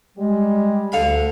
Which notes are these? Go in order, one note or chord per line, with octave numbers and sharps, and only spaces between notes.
G3 G#3
D2 D3 F5 B5